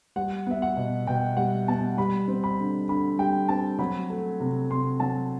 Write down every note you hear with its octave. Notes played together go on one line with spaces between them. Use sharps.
G3 F#5
B3 E5
F#5
B2
B2 G5
G3 F#5
B3 A5
G3 B5
C4
B5
D3
D3 B5
G3 G5
C4 A5
F#3 B5
A3
C3
C3 C6
F#3 A5